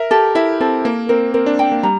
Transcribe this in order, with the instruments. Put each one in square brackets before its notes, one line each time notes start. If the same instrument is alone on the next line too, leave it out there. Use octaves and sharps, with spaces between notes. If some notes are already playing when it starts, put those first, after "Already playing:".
Already playing: [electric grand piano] A#4 [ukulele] E5
[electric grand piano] G4 [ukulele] A4
[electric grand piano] E4 [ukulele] E5
[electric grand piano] C4 [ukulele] A4
[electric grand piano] A#3 [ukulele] A#4
[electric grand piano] C4 [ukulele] A#4
[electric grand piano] C4 [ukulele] A#4
[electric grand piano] D4
[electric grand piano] C4 [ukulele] G5
[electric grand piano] A#3
[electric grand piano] G3 [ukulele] A#5